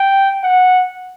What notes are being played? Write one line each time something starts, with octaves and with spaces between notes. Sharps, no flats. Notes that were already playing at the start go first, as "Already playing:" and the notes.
Already playing: G5
F#5